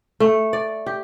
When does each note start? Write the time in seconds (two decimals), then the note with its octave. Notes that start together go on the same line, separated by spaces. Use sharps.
0.20 A3
0.53 D5
0.86 G4